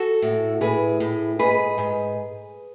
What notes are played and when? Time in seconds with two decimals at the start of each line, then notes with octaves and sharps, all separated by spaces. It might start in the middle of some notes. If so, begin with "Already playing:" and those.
Already playing: F#4 A4
0.22 A2
0.61 A2 G#4 B4
1.00 A2
1.39 G#2 G#4 B4
1.78 G#2